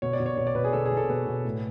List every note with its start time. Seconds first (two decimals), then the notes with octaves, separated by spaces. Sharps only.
0.02 B2 C#5
0.13 D5
0.20 B2
0.26 C#5
0.37 B2 C#5
0.47 D5
0.55 B2 B4
0.64 G#4
0.73 B2 A4
0.86 G#4
0.91 B2
0.97 A4
1.09 B2 B4
1.27 B2
1.44 A2